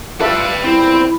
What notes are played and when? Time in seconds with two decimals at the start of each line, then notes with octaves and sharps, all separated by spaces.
0.21 G3 D4 F4 A4 B4 E5
0.64 E2 A#2 G3 C4 E4